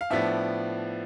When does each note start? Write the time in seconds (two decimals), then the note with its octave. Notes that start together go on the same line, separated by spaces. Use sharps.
0.01 F5
0.10 A2 F3 B3 D4 E5